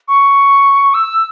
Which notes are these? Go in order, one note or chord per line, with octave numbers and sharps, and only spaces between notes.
C#6
E6